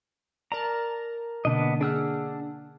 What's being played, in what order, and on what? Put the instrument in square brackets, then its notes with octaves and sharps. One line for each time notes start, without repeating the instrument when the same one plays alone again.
[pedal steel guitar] A#4 A#5 [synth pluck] D5 A5
[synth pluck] B2 D3 A#3 [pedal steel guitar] B3 D4 D#5
[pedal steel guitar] D4 E6 F6 [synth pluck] G#4 F#5